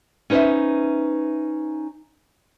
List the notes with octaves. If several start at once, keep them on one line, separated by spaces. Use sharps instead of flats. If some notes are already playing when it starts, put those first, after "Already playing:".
C#4 D#4 B4 C5 E5